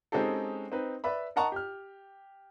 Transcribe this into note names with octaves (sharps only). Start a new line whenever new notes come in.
G#3 C4 C#4 D#4 G4 A4
C4 D#4 B4
B4 D5 E5 B5
A#4 D#5 F#5 A5 A#5 C#6
G4 F6